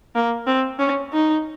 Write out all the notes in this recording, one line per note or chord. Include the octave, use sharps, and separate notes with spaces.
A#3
C4
C#4
D#4